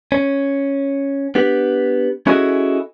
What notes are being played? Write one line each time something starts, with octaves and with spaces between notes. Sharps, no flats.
C#4
B3 D4 G4
C#4 E4 F#4 G#4 A4 D#5